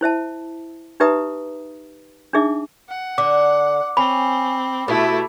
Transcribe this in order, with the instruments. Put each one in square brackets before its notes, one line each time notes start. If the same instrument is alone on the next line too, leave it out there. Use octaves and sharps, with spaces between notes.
[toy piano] E4 C5 E5 A5
D#4 G4 B4 E5 A#5 D#6
D4 D#4 G#4 E5 D6
[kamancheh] F#5
[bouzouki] D3 [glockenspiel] D6
[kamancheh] C4 [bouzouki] C#4 [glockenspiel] B5
[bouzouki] B2 G4 [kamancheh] A3 E4